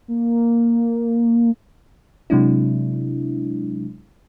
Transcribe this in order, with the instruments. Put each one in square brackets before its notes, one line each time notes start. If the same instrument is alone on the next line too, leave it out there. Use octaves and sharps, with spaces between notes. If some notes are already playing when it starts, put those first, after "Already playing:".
[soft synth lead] A#3
[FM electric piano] C3 F#3 G#3 D4 E4